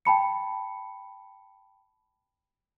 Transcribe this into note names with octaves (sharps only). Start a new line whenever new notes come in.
G5 A5 B5 C#7